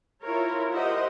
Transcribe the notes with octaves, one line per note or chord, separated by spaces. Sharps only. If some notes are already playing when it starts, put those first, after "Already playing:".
E4 F4 A#4 C#5
G4 A#4 C5 D#5 E5 F#5